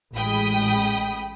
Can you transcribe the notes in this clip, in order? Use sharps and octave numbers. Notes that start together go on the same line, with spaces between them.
A1 G#3 G5 B5 D#6